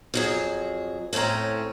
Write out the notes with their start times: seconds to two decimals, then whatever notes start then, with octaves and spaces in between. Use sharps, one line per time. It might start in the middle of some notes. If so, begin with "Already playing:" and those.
0.14 F2 F#3 G#4
1.13 A2 A3 C4 C#4 A#5